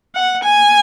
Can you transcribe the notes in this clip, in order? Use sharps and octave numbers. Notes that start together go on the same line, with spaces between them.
F#5
G#5